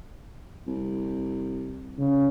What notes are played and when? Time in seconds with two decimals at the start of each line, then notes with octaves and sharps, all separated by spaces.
0.67 C2
1.99 C#3